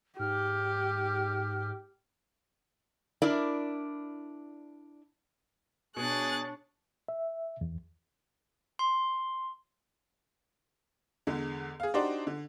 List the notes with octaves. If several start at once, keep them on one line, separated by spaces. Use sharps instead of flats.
G#2 G4 F6
D4 E4 A#4 D5
B2 D4 G#4 C#5 F#6 A6
E5
E2
C6
E2 D3 G#3
G#4 F5
D4 D#4 F#4 G4 C5 D5
D3